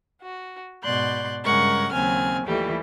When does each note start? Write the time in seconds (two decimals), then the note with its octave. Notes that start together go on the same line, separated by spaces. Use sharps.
0.21 F#4
0.83 G#2 B2 D5 C6 F#6 G6
1.44 G2 C#3 G#3 A#4 F#5 C#6
1.93 D#2 C#3 F#3 C4 G#5 F6
2.46 D#2 E3 F3 G3 A3 G4